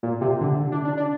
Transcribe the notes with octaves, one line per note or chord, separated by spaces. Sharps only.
A#2
C3
D3
D4
D4
D4